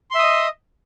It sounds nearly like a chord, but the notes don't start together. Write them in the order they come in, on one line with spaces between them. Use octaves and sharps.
C6 E5 D#6 D#5